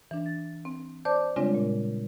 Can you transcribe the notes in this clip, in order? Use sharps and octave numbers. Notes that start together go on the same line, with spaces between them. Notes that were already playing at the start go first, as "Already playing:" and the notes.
E3 D4
A6
C4
C5 D5 A5 D6 G6
C#3 G3 G#3 C4 D4 F4
A#2